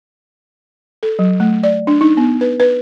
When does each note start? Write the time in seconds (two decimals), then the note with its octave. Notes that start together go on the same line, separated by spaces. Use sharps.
1.03 A4
1.19 F#3
1.40 A3
1.63 D5
1.87 D4
2.01 D#4
2.17 B3
2.41 B4
2.60 B4